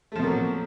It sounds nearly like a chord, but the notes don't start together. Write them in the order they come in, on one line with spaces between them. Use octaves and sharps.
A3 F3 B2 A#3 F#3